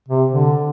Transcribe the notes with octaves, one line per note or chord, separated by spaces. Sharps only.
C3
D3